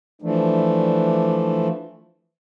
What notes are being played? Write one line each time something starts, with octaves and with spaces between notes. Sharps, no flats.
E3 F3 A3 D4